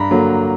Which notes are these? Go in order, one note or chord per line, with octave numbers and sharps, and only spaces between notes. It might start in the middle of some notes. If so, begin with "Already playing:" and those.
Already playing: G2 A#5 B5
D3 F#3 A#3